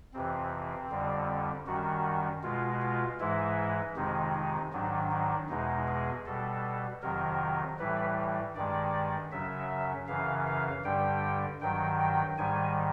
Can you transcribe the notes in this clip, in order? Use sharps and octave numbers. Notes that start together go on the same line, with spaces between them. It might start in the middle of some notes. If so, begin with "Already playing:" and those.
F2 C3 E3 C4
F2 D3 G3
F#2 D#3 G3 F#4
B2 G#3 F4
F4
G#2 E3 G#3 E4
F2 C3 D#3 G#3 D#4
D#4
G#2 D#3 F#3 D4
D4
E2 B2 G#3 D#4
G#4
B2 G3 A4
F2 C3 D#3 F#3 A#4
A2 E3 G3 B4
G2 D#3 G#3 D5
F#2 C#3 F#3 E5
F#2 C#3 E3 F5
F5
G2 D3 G3 G5
G2 D#3 F#3 G5
G5
G#2 D#3 G3 G#5